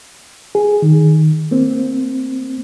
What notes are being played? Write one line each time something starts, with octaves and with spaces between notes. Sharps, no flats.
G#4
D#3
A#3 C4